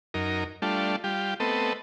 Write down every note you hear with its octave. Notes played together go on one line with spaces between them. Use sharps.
F#2 D#4 A#4
G3 A3 D4 F4
G3 F4 G4
A3 B3 C4 A4 D#5